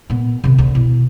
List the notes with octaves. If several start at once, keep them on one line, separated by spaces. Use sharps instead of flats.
A#2 B3
C3 D#3
D2
B2 E4